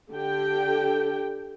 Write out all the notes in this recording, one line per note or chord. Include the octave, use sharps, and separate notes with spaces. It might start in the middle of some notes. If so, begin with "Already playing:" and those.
D3 G4 G5